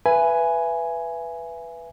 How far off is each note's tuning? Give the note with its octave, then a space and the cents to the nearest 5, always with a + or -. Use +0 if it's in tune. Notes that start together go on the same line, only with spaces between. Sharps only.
B4 +0 E5 +30 G#5 +0